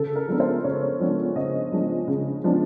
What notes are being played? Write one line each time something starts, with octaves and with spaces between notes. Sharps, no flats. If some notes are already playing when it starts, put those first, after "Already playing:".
Already playing: C#3 A4
A#4
F3 G#3 B3 D4
C5
C#3 C#5
F3 G#3 B3 D4
C#3 D#5
F3 G#3 B3 D4
C#3
F3 G#3 B3 D4